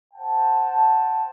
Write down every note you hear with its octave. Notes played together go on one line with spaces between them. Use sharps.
C5 F#5 G5 A5